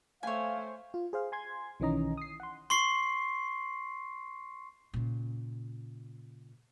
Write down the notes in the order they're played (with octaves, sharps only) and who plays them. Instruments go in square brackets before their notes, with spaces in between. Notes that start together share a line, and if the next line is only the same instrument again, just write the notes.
[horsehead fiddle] A3 C5 [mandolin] C#5 G#5 [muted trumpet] F5
[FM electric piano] F4
G#4 C5 F5
G#5 C6 G#6
B1 D#3 E3 C#4 D#5 A#5
D#6 C7
F#5 C6
[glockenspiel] C6 C#6 C7
[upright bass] A#2 C#3